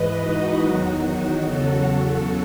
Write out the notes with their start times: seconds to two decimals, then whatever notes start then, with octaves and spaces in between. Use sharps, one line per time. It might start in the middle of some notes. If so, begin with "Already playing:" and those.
Already playing: G#2 E3 B4 D#5
0.21 D#4 F#4
0.62 E2 D#3 F#3
1.43 E2 C#3 F#3 F#4 A4